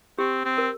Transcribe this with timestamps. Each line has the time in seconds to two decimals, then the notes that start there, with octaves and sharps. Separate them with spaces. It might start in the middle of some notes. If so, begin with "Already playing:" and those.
0.19 C4 G4
0.45 C4
0.58 A#4